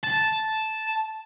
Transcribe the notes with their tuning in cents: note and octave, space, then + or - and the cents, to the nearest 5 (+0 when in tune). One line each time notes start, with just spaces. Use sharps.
A5 -5